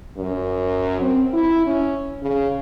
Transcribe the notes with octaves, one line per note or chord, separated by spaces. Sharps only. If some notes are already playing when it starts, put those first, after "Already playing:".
F#2
C4
E4
C#4
C#3